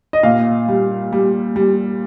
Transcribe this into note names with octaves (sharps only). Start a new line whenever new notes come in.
D#5
A#2 F5
G3
G3
G3